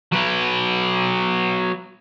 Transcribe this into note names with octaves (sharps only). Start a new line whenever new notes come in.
F#3 B4